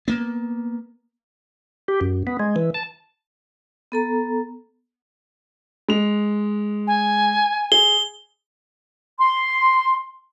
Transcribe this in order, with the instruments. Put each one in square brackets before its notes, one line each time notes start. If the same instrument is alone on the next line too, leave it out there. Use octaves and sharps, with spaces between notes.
[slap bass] A#3 B3
[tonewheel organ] G4
F#2
B3
G#3
E3
A5
[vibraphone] B3 A4 A#5
[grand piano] G#3 F7
[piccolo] G#5
[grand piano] G#4 [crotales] G7
[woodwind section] C6